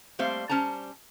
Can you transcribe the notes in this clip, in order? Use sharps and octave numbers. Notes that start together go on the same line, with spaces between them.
G3 A3 A#3 C4 C5 F5
G3 C#4 C5 A5 A#5